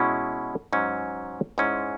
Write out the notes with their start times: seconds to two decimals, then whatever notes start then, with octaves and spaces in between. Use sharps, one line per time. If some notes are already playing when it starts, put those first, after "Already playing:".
Already playing: B2 G#3 C#4 E4
0.73 G#2 F#3 C#4
1.58 G#2 G#3 C#4 E4